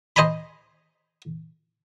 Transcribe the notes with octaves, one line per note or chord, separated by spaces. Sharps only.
C5 D#5 G#5 A#5 B5